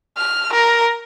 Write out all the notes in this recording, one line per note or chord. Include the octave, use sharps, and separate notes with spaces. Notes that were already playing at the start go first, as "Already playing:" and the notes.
F6
A#4